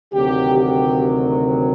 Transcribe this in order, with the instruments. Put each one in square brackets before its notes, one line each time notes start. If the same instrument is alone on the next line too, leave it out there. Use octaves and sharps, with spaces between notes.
[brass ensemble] D2 C3 D#3 F#3 G4
G4